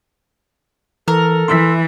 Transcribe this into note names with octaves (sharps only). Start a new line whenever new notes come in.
E3 A4 A#4
E3 C6 E6 B6